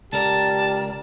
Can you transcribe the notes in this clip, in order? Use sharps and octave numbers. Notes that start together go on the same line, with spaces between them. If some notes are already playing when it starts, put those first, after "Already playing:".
C#2 G4 A#4 D5 A5